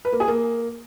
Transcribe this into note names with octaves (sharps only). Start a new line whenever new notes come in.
B4
A#3
G#4
A#3